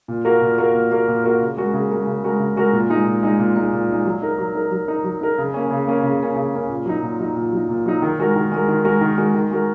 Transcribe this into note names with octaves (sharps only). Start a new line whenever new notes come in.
A#2
A#3 F#4 A#4
A#2
A#3 F#4 A#4
A#2
A#3 F#4 A#4
A#2
A#3 F#4 A#4
C#3
G#3 F#4 A#4
C#3
G#3 F#4 A#4
C#3
G#3 F#4 A#4
C#3
G#3 F#4 A#4
A#2
G#3 D#4
A#2
G#3 D#4
A#2
G#3 D#4
A#2
G#3 D#4
F#3
D#4 A#4
F#3
D#4 A#4
F#3
D#4 A#4
F#3
D#4 A#4
C#3
A#3 C#4
C#3
A#3 C#4
C#3
A#3 C#4
C#3
A#3 C#4
A#2
F#3 D#4
A#2
F#3 D#4
A#2
F#3 D#4
A#2
F#3 D#4
D#3
G#3 F#4 A#4
D#3
G#3 F#4 A#4
D#3
G#3 F#4 A#4
D#3
G#3 F#4 A#4
D#3
G#3 F#4 A#4